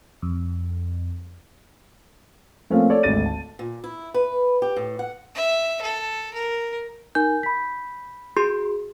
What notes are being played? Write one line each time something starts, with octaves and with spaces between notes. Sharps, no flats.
F2
F3 A3 A#3 C4 C#4 F5
A4 C#5 D5
G#1 D2 A4 A6 D#7
A5
A#2
E4
B4
G4
A2
F#5
E5
A4
A#4
D#4 A#4 G#5 G6
B5 B6
F#4 G#4 C6